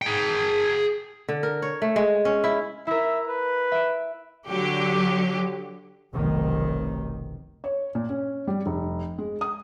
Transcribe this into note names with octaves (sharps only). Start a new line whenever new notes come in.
G#4 G5
D3
A#4
C#5
A3
G#3
C#4
E4
E4 A#4 E5
B4
E5 D7
D3 F#3 G4
F1 B1 D#3
C#5
A#2
C#4
G3
F1
G#3
D#6